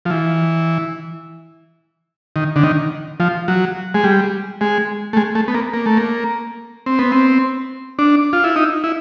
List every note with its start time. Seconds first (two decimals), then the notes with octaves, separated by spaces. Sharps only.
0.05 F3
0.10 E3
2.36 D#3
2.56 D3
2.63 D#3
3.20 F3
3.48 F#3
3.94 G#3
4.04 G3
4.61 G#3
5.13 A3
5.17 G#3
5.35 A3
5.48 B3
5.54 A#3
5.74 A#3
5.86 A3
5.97 A#3
6.86 C4
6.99 B3
7.12 C4
7.99 D4
8.33 F4
8.44 E4
8.56 D#4
8.84 E4